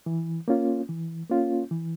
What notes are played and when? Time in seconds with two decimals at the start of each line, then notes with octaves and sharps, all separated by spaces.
0.06 E3
0.48 A#3 C#4 F4
0.89 E3
1.30 A#3 C#4 F4
1.71 E3